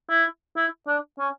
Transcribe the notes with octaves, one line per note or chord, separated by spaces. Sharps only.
E4
E4
D4
C#4